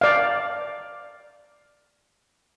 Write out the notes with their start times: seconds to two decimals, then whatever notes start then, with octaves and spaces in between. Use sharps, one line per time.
0.01 D5 F5